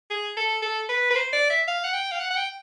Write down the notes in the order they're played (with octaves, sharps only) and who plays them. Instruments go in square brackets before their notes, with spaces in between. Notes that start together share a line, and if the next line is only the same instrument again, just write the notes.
[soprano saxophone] G#4
A4
A4
B4
B4
C5
D5
E5
F5
F#5
G5
F5
F#5
F#5
G5